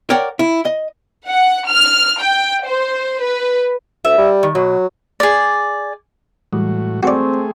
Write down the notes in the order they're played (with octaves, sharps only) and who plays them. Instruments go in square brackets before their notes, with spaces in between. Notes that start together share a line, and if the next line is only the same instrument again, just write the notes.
[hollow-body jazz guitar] A#4 C#5 D5 F#5 G5
E4
D#5
[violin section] F#5
F6
G5
C5
B4
[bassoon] D2 [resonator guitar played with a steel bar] E5
[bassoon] G3
[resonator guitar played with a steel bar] D#3
[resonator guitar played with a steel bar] B2 [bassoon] F#3
[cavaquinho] G#4 D5
[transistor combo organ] A2 F#4 [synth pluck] E3 G3 G#3
[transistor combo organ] A3 G#4 [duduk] C4 [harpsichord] F#4 D5 [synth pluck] G5 C6 C#6